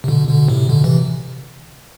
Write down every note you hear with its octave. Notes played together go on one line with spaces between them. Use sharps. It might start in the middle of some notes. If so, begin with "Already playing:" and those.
C3
B2 D3
B2 D3
A2 C3
B2 D3
C3 E3